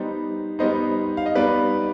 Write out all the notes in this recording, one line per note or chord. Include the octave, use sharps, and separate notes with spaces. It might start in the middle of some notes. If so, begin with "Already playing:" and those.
Already playing: G3 B3 D#4 C5 D#5
G3 B3 D#4 C5 D#5
F5
D#5
G3 B3 D#4 B4 D5